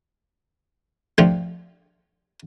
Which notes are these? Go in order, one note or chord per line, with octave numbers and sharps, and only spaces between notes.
F3 A3 D4 F4 G4